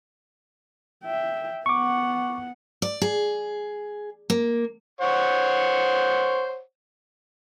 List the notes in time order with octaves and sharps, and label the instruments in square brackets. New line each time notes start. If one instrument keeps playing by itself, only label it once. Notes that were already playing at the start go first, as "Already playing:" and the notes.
[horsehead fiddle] E5 G5
[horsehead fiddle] B3 F#5 [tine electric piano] C#6 D6
[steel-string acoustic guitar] D5
G#4
A#3
[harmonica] C5 C#5 F#5